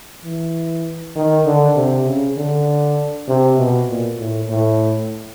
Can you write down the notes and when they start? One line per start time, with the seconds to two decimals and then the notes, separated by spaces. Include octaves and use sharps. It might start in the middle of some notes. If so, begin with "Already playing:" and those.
0.24 E3
1.15 D#3
1.46 D3
1.76 C3
2.07 C#3
2.37 D3
3.28 C3
3.58 B2
3.89 A#2
4.19 A2
4.49 A2